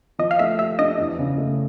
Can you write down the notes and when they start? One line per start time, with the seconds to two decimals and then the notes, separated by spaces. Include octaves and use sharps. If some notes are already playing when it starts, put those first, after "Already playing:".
0.19 F3 D#5
0.31 F5
0.39 A3 E5
0.59 G4 E5
0.79 D4 D#5
0.98 E2
1.19 C#3
1.38 A3